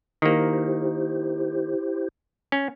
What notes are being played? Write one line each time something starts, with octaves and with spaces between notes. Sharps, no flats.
D#3 A#3 E4 G4 C5
C#4